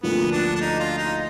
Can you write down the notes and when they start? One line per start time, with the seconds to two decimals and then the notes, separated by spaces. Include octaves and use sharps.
0.03 D2 D3 F3 A#3 B3 F4
0.32 D4
0.56 D4
0.61 D#4
0.80 F4
0.98 D#4